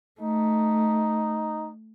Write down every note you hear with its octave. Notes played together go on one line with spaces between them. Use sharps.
A3 D#4